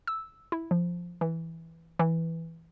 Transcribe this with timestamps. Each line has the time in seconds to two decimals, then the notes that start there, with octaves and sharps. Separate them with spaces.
0.07 E6
0.52 E4
0.71 F3
1.21 E3
1.99 E3